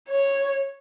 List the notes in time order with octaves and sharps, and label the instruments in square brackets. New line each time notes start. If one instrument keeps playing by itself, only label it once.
[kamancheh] C#5